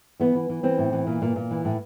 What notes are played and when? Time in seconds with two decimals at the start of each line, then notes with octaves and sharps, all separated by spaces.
0.20 E3 B3
0.35 E3
0.49 E3
0.63 E3 C4
0.78 A2
0.93 E3
1.07 A#2
1.22 A#2
1.36 A#2
1.51 E3
1.65 A2